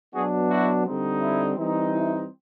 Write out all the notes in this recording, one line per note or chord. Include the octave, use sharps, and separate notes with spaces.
B2 F#3 B3 D4 F#4 G#4
E4 F#4
D3 G3 C4 D#4
E4
E3 G3 C4 D#4
E4